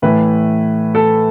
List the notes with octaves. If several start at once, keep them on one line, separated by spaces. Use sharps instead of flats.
A2 E3 A3 B4
A4